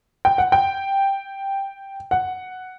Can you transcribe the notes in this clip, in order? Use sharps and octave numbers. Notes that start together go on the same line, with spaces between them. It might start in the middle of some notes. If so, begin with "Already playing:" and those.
G5
F#5
G5
F#5